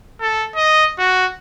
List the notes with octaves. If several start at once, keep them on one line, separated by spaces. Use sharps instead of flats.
A4
D#5
F#4